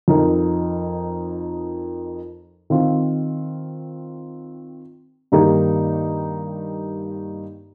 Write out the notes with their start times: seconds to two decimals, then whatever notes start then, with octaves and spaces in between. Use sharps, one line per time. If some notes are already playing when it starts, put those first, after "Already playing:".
0.08 F2 F3 D#4 A#4
2.70 D#3 C4 F4
5.32 G2 D#3 A#3 D#4 G4